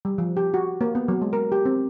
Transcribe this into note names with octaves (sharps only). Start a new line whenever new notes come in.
G3
F3
G4
F#4
A#3
B3
F#3
G#3
A#4
G4
C4